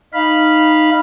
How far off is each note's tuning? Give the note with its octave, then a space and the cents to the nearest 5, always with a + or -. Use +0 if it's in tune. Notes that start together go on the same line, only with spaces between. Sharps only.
D#4 -10 F5 -10 B5 -10